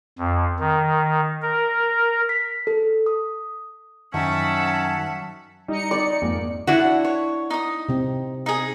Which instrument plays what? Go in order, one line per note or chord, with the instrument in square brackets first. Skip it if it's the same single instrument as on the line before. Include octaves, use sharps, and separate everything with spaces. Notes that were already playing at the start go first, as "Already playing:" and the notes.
[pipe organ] F2
D#3
A#4
[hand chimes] B6
A4
D#6
[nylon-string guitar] F#2 D#3 F#3 [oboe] C#4 [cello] E5 F#5 [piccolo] A5
[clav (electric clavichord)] G3 [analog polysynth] D#4 C#7
[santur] D5
[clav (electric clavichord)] F2 G#2 [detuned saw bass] A#3
[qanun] D4 E4 F#4 [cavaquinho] F#5
[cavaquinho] C#5
D#4 D#6
[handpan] C3 C4
[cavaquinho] D#4 G#4